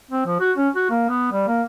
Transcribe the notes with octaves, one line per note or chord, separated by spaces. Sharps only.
C4
F3
F#4
C#4
F#4
A#3
B3
G3
A#3